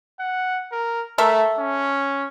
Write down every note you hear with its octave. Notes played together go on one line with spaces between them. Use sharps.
F#5
A#4
A3 A4 A#4 E5
C#4